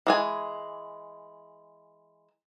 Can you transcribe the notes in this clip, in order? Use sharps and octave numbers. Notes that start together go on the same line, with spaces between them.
E3 G#3 G#5